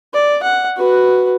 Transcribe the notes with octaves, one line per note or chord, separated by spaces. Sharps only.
D5
F#5
F#4 B4